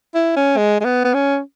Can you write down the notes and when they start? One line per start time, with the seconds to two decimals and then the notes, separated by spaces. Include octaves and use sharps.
0.15 E4
0.36 C#4
0.57 G#3
0.80 G#3
0.85 B3
1.04 B3
1.14 C#4